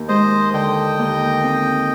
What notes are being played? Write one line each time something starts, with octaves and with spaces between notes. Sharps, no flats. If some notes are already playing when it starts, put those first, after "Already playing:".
Already playing: D#2
G#3 C5 D#5
D3 D#5 G5
D#2
C4